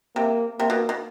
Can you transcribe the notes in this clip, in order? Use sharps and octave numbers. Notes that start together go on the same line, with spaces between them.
C3 A#3
C3 A#3
B2
B2